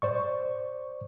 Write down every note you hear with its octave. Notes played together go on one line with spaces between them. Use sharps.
C5 D5 C#6